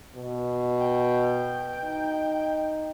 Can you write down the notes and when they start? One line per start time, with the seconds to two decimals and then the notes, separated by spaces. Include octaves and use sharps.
0.16 B2
0.79 G5
1.84 D#4